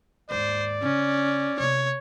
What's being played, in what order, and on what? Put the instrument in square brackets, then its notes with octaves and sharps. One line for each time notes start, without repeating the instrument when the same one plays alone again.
[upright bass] D#2 G#2 [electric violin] C5 [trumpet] D5
[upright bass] C#3 [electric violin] C#4
[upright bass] C3 B3 [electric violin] C#5